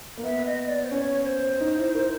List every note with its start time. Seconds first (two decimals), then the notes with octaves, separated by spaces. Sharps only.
0.18 A#3
0.23 B3 E5
0.46 D#5
0.68 D5
0.85 C5
0.91 C#4 C#5
1.26 C5
1.61 D#4
1.77 E4
1.95 A#4